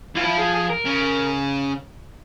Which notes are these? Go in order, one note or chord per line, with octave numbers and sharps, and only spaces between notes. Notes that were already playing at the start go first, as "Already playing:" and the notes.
E3 F4
F3 E4
G#4
G#4
A#4
C#3